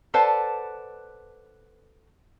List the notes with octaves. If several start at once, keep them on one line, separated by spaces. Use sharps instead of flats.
A4 B4 C5 D5 F#5 A5